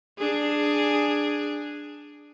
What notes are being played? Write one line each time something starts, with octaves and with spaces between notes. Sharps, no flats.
D4 G#4